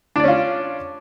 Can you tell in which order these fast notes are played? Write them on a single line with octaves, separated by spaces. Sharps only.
D4 D5 C#4 F4